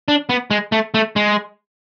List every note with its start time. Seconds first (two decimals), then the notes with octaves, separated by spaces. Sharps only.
0.08 D4
0.29 B3
0.51 G#3
0.72 A3
0.94 A3
1.16 G#3